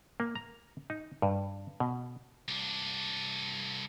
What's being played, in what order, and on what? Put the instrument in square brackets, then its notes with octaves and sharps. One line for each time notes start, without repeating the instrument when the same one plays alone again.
[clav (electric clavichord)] A#3
A#5
D#4
G2
B2
[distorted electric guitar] C2 D4